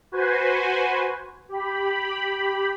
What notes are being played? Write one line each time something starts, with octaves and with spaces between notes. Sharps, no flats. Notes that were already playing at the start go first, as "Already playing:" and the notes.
F#4 B4 C5 G#5
G4 B5